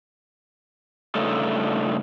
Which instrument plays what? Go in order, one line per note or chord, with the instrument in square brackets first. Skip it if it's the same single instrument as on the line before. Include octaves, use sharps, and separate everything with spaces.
[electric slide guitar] G2 C#3 A3 D#4 F4 A4